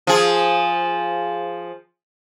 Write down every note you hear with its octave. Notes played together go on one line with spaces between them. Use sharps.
F3 G#4